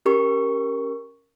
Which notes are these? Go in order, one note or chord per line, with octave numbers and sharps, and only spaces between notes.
C#4 G4 A#4 C#6